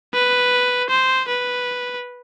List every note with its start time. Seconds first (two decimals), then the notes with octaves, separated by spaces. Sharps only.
0.14 B4
0.90 C5
1.28 B4